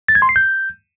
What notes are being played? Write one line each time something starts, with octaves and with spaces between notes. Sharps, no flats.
A6
G#6
C6
C7
G6